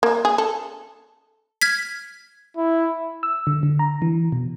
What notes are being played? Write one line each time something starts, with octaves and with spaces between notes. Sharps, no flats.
A#3
G#4
A4
F6 G#6 B6
E4
E6
D3
D3
A#5
E3
B2